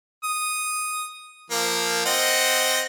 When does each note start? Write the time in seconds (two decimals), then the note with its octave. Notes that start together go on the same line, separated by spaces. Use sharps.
0.23 D#6
1.50 F3 A#3
2.05 C4 D#5 F#5